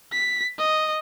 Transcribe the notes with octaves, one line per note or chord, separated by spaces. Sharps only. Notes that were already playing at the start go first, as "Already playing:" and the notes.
B6
D#5